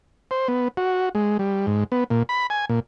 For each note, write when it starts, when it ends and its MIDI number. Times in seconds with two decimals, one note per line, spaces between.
0.31 0.48 72
0.48 0.68 59
0.77 1.09 66
1.15 1.37 56
1.39 1.66 55
1.67 1.84 44
1.92 2.04 59
2.10 2.23 46
2.29 2.47 83
2.50 2.65 80
2.69 2.80 46